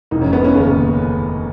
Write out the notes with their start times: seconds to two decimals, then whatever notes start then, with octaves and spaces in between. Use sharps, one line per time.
0.11 F1 D#4
0.22 C#4
0.33 B3
0.44 C#4
0.55 D#2 C#3